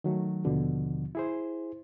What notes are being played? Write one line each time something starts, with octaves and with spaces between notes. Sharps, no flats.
D#3 F#3 A3
D#2 B2 D3 F3
E4 G#4 C5